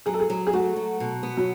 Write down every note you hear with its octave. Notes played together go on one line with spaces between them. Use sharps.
F#3 G#4
A4
G#4
F#3
G#4
A3 F#4
F#3
B2
B3
F#3